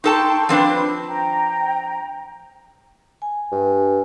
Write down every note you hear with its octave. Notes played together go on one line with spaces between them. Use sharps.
D#4 A4 G5 A5 C6 C#6
F3 C4 D4 B4
G5 A#5
G#5
G2